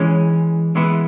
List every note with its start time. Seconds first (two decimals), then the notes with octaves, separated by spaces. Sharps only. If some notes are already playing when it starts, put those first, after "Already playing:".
Already playing: E3 G#3 C#4
0.75 E3 G#3 B3 E4